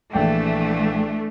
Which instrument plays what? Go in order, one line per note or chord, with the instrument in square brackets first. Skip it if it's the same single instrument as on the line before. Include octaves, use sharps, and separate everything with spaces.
[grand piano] A#1 G5 [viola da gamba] E3 D4 [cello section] A3